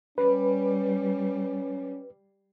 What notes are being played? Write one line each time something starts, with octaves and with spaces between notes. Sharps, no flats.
G3 C#4 B4